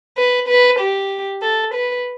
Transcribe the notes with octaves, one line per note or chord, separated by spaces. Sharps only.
B4
B4
G4
A4
B4